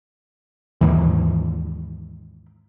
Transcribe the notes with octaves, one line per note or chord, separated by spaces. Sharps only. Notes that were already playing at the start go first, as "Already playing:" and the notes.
D#2 G#2 E3